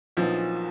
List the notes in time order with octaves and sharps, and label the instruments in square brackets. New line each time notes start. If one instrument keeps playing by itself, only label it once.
[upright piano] A#1 A#2 F#3 B3 D#4 [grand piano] F3